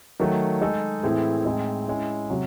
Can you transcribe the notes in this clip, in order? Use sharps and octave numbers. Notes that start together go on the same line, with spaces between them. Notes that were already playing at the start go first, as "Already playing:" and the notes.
D#3 F#3 A3
G#3 D#4 A4
A2 E3 C4 E4 G#4
A2 G#3 C4 D#4 G#4
G#3 C#4 E4
C3 F#3